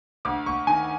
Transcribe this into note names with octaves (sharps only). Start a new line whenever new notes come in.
D2 D6
D2 C#6
D#3 G#5